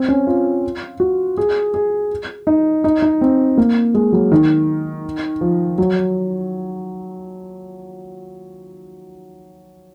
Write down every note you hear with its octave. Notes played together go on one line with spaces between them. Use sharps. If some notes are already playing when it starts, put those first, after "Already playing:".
Already playing: C4
C#4
F4
F#4
G#4
G#4
D#4
D#4
D#4
C4
A#3
G#3
F#3
D#3
F3
F#3